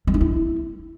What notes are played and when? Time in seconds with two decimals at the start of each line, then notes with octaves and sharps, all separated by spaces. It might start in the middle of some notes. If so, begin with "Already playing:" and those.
0.07 G#3
0.14 D#4
0.21 E4